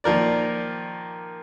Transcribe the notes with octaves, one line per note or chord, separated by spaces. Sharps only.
A#2 D#3 F3 A#4 D5